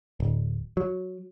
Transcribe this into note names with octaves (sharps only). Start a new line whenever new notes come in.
D1
F#3